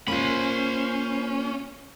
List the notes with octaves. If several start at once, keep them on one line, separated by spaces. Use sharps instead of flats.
A#3 C#4 F4 C5 B5